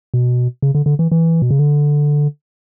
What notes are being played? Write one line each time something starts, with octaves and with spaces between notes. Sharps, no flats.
B2
C#3
D3
D3
E3
E3
B2
C#3
D3